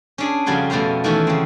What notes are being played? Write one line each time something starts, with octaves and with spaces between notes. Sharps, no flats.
C#4 D4 G#4
F2 C#3 G3 F#4 G#5 C6
F2 B2 A3 C#4 C5 A#5
D#3 E3 A3 B3 C#4 F#4
C#3 C4